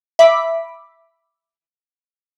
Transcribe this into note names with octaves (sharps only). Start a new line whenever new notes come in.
E5 B5 D6 B6